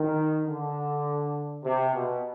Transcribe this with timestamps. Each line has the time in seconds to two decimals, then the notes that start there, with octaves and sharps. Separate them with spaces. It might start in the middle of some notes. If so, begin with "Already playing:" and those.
Already playing: D#3
0.44 D3
1.64 C3
1.94 B2